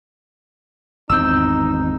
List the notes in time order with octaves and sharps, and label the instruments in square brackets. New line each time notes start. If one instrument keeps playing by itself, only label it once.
[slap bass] G#1 E2 C4 [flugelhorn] D#4 [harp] E6 G6